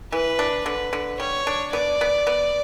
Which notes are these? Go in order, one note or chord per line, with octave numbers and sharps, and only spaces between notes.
E3 B4
D4
D3 B4
D3
G3 C#5
D4
B3 D5
B3
B3